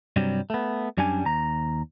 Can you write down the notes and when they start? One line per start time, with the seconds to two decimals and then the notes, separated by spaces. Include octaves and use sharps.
0.16 G2 C3 F#3 G3
0.50 A3 B3
0.97 F#2 G3 C#4 D4 G#5
1.25 D#2 A#5